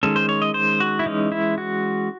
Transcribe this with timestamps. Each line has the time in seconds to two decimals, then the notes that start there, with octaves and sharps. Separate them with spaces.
0.03 D#3 G#3 C#4 A4
0.16 C5
0.29 C#5
0.42 D#5
0.54 C5
0.80 F#4
0.99 E4
1.06 E3 G#3 C#4 D#4
1.32 E4
1.58 F#4